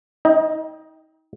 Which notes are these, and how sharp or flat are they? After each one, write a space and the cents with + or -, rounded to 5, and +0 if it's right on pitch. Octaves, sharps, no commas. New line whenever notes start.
D#4 +35 D#5 +0 G5 +0